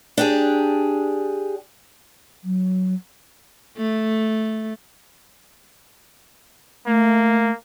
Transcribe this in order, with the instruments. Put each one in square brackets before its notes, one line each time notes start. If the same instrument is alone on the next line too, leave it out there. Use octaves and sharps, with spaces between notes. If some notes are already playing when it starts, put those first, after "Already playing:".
[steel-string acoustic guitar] D4 G4 G#4
[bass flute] F#3
[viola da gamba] A3
[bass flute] A3 [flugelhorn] A#3